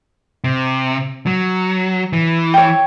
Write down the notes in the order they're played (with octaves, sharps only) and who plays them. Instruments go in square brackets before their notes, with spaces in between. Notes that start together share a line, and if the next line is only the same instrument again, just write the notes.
[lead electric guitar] C3
F#3
E3
[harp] C#5 G5